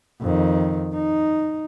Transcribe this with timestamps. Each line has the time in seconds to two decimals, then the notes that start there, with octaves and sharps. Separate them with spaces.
0.21 F2 D#3
0.94 D#4